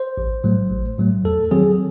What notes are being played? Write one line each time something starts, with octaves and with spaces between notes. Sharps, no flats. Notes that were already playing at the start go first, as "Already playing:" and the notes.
Already playing: C5
A1
A2 F#3 A3
A1
A2 F#3 A3
E2 A4
D#3 F#3 C4 G#4